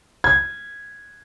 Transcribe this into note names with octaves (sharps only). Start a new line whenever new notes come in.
G#6